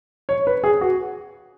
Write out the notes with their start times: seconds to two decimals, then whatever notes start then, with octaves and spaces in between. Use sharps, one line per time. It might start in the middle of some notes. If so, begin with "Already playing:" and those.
0.29 C#5
0.47 B4
0.64 G#4
0.81 F#4